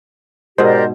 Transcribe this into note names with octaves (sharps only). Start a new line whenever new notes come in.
G#2 B2 G4 A#4 C5 D5